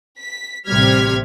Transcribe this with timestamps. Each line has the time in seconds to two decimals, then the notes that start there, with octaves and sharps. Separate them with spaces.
0.21 B6
0.68 A1 C3 G3 F6 G#6 B6